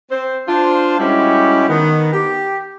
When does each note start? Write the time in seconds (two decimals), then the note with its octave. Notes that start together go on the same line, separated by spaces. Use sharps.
0.11 C4 C5
0.48 D4 F4 C5
0.99 G3 G#3 C#4 E4 F#4 G4
1.69 D#3 B3
2.13 G4